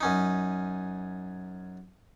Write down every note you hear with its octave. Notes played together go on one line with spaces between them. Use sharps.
F#2 C#4 D#4